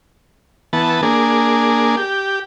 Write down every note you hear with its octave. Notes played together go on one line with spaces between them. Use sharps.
E3 B3 A5
A#3 D4 G#4
G4